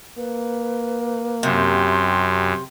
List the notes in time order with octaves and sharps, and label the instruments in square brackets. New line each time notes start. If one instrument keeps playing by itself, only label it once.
[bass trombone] A#3 [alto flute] B4
[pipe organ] F#2 [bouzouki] C3 [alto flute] C6